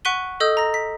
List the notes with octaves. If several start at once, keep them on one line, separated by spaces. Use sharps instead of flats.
F#5 C#6 F#6 B6 D#7 G7
A4 D#5 D#6 E6 G6
A#5 A#6
B6